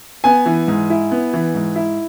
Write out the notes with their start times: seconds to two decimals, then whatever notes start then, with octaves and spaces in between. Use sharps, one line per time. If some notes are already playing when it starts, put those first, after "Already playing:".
0.24 B3 G#5
0.46 E3
0.68 G#2
0.90 E4
1.11 B3
1.33 E3
1.55 G#2
1.76 E4